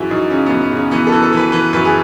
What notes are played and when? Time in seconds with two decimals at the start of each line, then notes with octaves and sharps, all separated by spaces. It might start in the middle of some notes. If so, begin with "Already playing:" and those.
Already playing: F#2 E3 E4 G#4
0.10 F#2 D#4
0.30 C#3 C#4
0.46 F#2 B3
0.61 B3
0.71 C#3
0.77 C#4
0.91 E3 B3
1.07 A4
1.12 E3
1.22 A4
1.33 E3 B4
1.52 E3 B4
1.73 F#2 B4
1.85 G#4